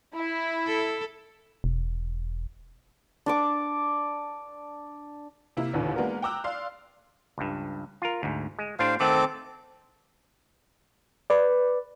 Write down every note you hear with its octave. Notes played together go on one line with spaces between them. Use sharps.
E4
A4
E1
D4 C#6 D6
C3 A#3 E4
A1 D#2 A#2 D3 B4
G#3 A#3 B3 D4 F#4 A#4
G5 A#5 D6 E6 F#6
D5 F5 C6
C#2 G2
F4 A#4
D2 G#2
G#3
A2 D4 G4 C5 F5
D#3 A3 C4 A4 F#5 D6
B4 D5